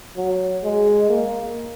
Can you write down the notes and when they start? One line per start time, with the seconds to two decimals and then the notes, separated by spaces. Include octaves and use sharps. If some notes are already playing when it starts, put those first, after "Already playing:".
0.17 F#3
0.63 G#3
1.10 A#3